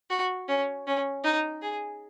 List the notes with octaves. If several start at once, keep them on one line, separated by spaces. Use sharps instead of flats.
F#4
C#4
C#4
D#4
G#4